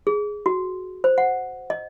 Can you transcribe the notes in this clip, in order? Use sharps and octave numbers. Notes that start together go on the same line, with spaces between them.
G#4
F#4
C5
F#5
D#5